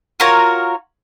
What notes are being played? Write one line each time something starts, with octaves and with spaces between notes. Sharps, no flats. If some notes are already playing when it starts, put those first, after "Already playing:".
F4 F#4 A#4 C#5